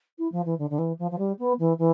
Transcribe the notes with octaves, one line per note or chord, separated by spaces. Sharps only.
E4
F3
E3
D3
D3
E3
F3
F3
G3
B3
E3
E3